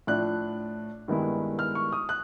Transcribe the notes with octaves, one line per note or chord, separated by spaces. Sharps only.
A2 F3 A3 D4 F#6
G2 D#3 G#3 B3 E4
F6
C#6
D#6
F#6